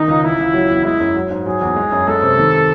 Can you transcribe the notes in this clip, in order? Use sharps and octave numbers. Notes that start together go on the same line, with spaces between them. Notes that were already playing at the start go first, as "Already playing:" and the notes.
Already playing: D#3 D#4
C#2
E3 E4
C#2
F#3
E2
G#3 E4
F#2
F#3
G#2
F#3 G#4
E2
G#3
F#2
G#3 A4
C3
D#3